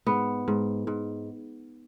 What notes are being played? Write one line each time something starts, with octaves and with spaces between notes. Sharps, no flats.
G#2 B3
G#2
G#2